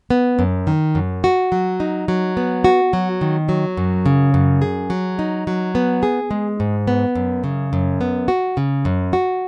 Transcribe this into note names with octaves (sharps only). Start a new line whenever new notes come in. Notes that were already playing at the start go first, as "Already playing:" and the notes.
B3
F#2
D#3
F#2
F#4
F#3
D#4
F#3
B3
F#4
F#3
D#3
F#3
F#2
C#3
F#2
G#4
F#3
D#4
F#3
B3
G#4
G#3
G#2
B3
F#2
C#3
F#2
B3
F#4
C#3
F#2
F#4